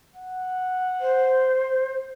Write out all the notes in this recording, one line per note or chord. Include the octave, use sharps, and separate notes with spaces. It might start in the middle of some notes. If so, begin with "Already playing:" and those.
F#5
C5